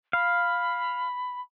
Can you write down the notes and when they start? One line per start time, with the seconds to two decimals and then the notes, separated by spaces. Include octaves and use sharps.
0.13 F5 B5